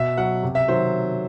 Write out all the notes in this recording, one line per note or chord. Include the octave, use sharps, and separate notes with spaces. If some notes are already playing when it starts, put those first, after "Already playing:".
Already playing: B2 E5
F#3 F#5
C3
E5
D#3 F#3 C5